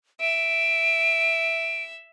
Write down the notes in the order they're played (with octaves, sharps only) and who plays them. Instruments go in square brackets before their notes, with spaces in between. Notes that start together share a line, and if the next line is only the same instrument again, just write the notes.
[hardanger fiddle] E5 [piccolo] D7